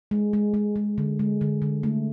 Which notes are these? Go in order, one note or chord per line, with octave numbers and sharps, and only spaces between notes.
G#3
G#3
G#3
G#3
D3
G#3
D3
D3
A3